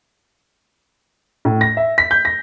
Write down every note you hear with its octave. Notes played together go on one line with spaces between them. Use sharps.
A2
A#6
E5
B6
G6
A#6